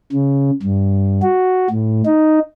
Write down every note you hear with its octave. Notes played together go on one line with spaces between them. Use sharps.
C#3
G2
F#4
A2
D#4